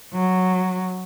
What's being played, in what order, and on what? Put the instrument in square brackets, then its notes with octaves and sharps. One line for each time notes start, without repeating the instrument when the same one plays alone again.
[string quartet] F#3